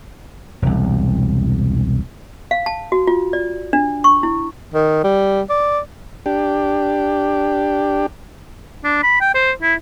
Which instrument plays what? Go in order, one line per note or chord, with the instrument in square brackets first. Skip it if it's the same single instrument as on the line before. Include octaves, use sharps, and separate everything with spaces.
[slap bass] E1 C2
[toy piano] F5
A5
F#4
F4
D5
D4
C#6
E4
[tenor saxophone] D#3
G3
D5
[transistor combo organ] D4 G4
[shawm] D4
B5
G5
C5
E4